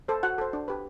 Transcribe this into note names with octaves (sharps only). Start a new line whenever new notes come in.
A4 C5
F#4 F#5
A4 C5
D4
G4 B4